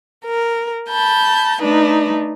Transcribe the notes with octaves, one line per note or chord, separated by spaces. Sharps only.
A#4
A5 B5 G6
A3 D4 D#4 B4